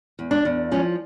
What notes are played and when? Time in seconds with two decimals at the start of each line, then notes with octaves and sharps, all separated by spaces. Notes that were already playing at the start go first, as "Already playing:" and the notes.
0.19 E2
0.31 D4
0.45 E2
0.72 F3 C#4